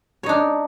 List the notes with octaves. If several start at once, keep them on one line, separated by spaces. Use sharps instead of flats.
D4 D#4 C#5